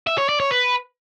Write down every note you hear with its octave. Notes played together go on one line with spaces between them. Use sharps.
E5
C#5
D5
C#5
B4